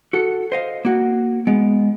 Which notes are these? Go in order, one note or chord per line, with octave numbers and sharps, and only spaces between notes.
F#4 A4
C5 D#5 F5
A#3 F#4
G#3 B3